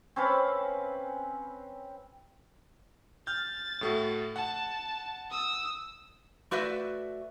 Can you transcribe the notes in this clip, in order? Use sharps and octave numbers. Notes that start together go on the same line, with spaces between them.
C4 C#4 B4 F5
F6 G6 A6
A2 A3 F#4
F#5 A5
D#6 E6
A3 F#4 B4 D5 E5